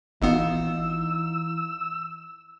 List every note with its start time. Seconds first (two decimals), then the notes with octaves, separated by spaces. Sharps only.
0.22 G#1 E3 B3 D#4 F4 D#5 E6